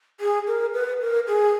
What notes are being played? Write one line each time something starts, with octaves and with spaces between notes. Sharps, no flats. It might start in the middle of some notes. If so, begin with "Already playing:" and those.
G#4
A#4
B4
A#4
G#4